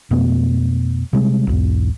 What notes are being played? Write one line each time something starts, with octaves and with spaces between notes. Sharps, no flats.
F2 B2 A3 B3
C3 G3 G#3
B1 E2 G#2